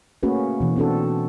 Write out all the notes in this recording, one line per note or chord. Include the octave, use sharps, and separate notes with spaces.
A3 A#3 C#4 F#4 G#4 B4
B2 E3
C4 D4 F#4 A4